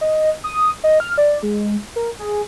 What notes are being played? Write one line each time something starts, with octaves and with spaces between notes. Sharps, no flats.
D#5
D#6
D#5
F6
D5
G#3
A#4
G#4